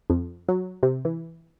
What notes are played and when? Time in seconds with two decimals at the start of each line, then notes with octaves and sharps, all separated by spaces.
0.10 F2
0.49 F#3
0.83 C3
1.05 E3